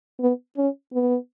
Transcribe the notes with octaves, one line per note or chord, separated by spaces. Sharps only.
B3
C#4
B3